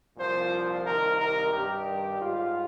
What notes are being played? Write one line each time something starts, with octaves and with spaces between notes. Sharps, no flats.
C2 A#2 F3 C5
C2 C3 D#3 A#4
A#4
G2 D#3 G3 G4
G#2 G3 F4